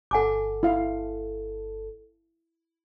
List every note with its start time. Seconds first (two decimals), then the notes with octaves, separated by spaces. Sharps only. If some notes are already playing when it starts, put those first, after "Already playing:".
0.11 G1 A4 F#5 G#5 D6
0.63 E4 F5